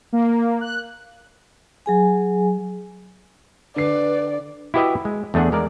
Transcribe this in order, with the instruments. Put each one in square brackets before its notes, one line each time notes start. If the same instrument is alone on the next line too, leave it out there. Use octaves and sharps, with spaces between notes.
[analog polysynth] A#3
F#6
[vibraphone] F#3 G#4 G#5
[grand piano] D3 C7 [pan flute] B4 [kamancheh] D5
[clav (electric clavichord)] E4 F#4 G4 B4 D#5 E5
G#3
E2 A3 D4 G#4 F#5
G#3 A#4 D5